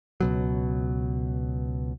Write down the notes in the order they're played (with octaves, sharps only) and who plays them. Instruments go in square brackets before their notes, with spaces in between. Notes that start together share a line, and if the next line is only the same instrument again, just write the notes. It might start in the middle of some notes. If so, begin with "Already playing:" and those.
[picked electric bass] C#2 B2 F#3